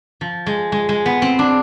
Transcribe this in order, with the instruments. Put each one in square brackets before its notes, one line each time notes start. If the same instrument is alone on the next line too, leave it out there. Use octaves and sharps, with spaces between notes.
[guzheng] F3
G#3
G#3
G#3
B3
C4
D4